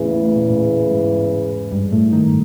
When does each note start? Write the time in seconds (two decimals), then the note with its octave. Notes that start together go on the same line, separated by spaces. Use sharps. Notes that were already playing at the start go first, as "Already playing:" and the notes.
Already playing: E2 A2 C#3 E3 A3
0.10 A#3
0.22 A3
0.35 A#2 A#3
0.50 A2 A3
0.91 G#2 G#3
1.71 G2 G3
1.92 A2 A3
2.12 D#3 D#4